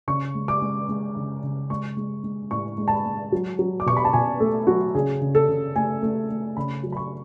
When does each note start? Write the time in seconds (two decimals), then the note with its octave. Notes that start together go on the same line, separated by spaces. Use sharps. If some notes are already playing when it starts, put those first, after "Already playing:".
0.08 C#3 C#6
0.35 G#3
0.48 D6
0.62 G#3
0.89 G#3
1.16 C#3
1.43 C#3
1.70 G#3 C#6
1.97 G#3
2.23 G#3
2.51 A2 C#6
2.78 G#3
2.88 A5
2.92 B5
3.06 G#3
3.32 F#3
3.59 F#3
3.80 D6
3.86 B2 C#6
3.97 B5
4.05 A5
4.13 B2 G#5
4.40 A3 A4
4.67 F#3 F#4
4.95 C#3 G#4
5.21 C#3
5.35 A4
5.49 C#3
5.76 A3 G#5
6.03 A3
6.30 A3
6.57 C#3 B5
6.83 F#3
6.92 B5
6.97 C#6